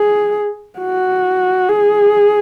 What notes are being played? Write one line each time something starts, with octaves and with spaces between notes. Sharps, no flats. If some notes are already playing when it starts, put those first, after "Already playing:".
Already playing: G#4
F#4
G#4